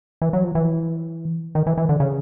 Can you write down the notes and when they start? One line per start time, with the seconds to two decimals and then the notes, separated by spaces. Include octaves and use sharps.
0.22 E3
0.33 F#3
0.44 F3
0.55 E3
1.55 D#3
1.67 E3
1.78 E3
1.89 D3
2.00 C#3